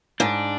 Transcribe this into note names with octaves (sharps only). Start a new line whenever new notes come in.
G#2 D4